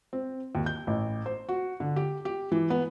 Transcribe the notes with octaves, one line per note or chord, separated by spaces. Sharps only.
C4
D#2
G6
A1
C5
F#4
D3
G4
G4
E3
B3